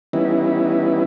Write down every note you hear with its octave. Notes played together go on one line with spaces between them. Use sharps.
E3 G3 B3 C#4 D#4 E4